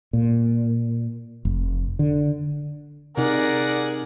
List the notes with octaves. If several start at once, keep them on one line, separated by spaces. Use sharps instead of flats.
A#2
F1
D3
C3 D#4 G#4 A#4 D5 F#5